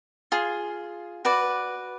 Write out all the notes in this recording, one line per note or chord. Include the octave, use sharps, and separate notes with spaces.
F4 G#4
F#4 B4 D5